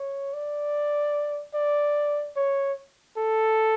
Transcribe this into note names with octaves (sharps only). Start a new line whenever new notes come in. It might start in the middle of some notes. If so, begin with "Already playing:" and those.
Already playing: C#5
D5
D5
C#5
A4